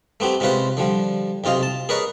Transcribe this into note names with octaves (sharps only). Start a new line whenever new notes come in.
A3 B3 C4 G4
C3 G#3 C#4 F4 B4 C5
D3 F3 G3
B1 C3 F4 D#5 F5
A5
G#4 A#4 B4 C#5 D#5